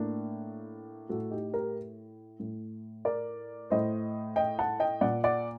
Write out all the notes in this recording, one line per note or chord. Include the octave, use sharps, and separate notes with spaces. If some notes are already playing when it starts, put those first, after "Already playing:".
Already playing: A2 A#3 D4
A2 F#4 A4
D#4 G4
G4 A#4
A2
A#4 D5
A2 C5 D#5
D#5 G5
F#5 A5
D#5 G5
A#2 D5 F#5
D5 F#5